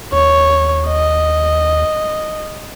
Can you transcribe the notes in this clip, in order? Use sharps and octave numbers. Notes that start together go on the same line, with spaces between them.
D#2 C#5
D#5